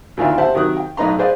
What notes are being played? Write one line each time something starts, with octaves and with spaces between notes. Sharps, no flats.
D2 D#3 E3 F4 D5 E5
G4 C5 E5 F#5 A5
C3 D#3 F#3 D#6 F#6
G5
B1 A2 D#4 B4 A#5 C6
G#4 B4 C5 D5 D#5 F5